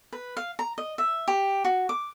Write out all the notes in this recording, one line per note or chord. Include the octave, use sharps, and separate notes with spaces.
B4
F5
A#5
D#5
E5
G4
F#4
D6